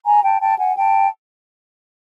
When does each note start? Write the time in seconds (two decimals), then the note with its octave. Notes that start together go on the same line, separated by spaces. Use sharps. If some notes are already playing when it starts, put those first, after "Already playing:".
0.05 G#5 A#5
0.22 G5 A5
0.41 G5 A5
0.59 F#5 G#5
0.76 G5 A5